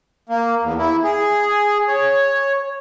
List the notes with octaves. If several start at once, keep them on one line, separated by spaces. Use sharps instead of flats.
A#3
E2
E4
G#4
C#5